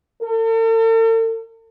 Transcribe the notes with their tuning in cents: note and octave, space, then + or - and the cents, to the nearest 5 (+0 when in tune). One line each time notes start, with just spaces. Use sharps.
A4 +45